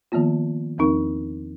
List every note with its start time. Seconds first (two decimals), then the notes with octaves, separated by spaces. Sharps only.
0.12 D#3 F3 A#3 B3 F4
0.78 E2 F3 C4 D#4 A#4